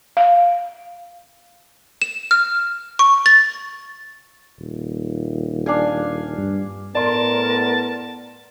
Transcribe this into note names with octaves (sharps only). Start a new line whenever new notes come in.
F5
E7
F6
C#6
A6
D#1
D4 F5 G#5
G2
A2 B3 A#4 D5 A5 C6